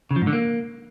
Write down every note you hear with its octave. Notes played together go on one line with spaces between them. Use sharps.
C#3
F3
G#2
D3
A#3